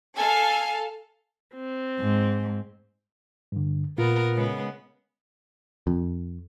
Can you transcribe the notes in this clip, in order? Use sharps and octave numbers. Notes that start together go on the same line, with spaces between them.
A4 F5 G#5
C4
G#2
G2 D3
A#2 B3 F4 A#4
C#3 G#3 B3
F2